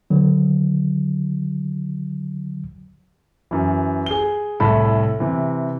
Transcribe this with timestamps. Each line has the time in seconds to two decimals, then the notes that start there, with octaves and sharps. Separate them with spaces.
0.10 D3 F#3
3.51 F#2 E3
4.06 G#4 G7
4.60 C2 A2 A4 B5
5.20 C3 E3